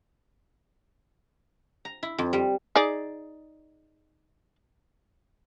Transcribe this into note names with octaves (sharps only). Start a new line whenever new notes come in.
A#5
E4
F2
G3
D#4 G#4 D5